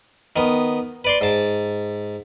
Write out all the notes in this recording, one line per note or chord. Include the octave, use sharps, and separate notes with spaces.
D#3 B3
B4 D5 C6
G#2 A5